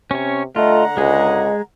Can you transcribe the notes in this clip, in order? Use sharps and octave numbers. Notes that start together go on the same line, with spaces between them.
C3 C#4 C#5
D3 A3 F4 D#5 F#5 A#5
C#2 G#3 G#4 D#5